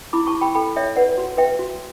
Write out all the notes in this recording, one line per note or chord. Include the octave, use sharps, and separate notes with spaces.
E4 B5 D6
A5 C#6
E4
G5 B5
A4 G5 B5
C#5 E5 G5
B4 D5 F#5
F#4
B4 E5 G5
F#4